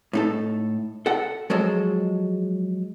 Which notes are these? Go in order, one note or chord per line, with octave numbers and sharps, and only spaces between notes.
A2 D#4 A4
A4 F#5
F3 F#3 G#3 A4 C5